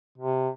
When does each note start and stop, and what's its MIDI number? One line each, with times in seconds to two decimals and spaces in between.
0.18 0.49 48